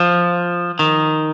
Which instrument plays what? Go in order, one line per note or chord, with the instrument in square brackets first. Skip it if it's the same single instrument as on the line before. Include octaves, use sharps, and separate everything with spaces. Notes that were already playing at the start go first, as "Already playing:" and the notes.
Already playing: [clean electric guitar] F3
D#3